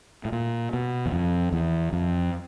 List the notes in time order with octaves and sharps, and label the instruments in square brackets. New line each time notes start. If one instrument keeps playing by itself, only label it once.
[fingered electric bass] A2
A#2
B2
E2
F2
E2
F2